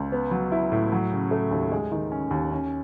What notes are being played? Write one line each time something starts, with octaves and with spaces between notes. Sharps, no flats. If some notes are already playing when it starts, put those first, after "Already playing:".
Already playing: C#2
B3
F#3
E4
A2
F#3
C#3
A3
D#2
G#3
D#3
C#4
D#2
C#4